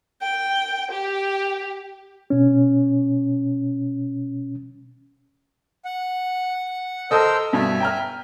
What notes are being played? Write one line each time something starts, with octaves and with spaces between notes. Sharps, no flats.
G5
G4
B2 C#4
F#5
A4 A#4 C5 D#5 E6
G2 B2 B4 E5 G#5
G5 A#5 F6